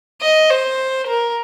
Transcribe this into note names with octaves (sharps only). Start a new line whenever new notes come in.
D#5
C5
A#4